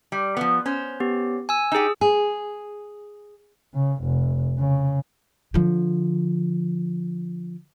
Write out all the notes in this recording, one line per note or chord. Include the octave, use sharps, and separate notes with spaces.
G3
F3 B3
C#4 C5
B3 G4
G#5 E6
D#4 G4 G#4 E6
G#4
C#3
F1
C#3
D3 F3